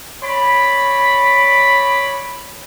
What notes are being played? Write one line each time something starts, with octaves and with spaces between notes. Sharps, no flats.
C#5 D5 B5